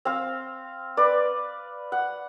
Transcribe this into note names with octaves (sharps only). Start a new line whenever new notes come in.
C4 F5
B4 D5
F#5